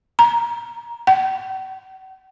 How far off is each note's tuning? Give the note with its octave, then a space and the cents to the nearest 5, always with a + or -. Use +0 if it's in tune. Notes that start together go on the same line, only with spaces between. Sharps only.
A#5 +20
F#5 +40